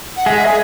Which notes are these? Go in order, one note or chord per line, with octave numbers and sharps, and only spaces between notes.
F#5
G#3 G#4 E5
G#4